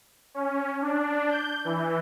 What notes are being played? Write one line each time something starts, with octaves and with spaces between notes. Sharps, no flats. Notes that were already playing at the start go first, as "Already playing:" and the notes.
C#4
D4
G6
E3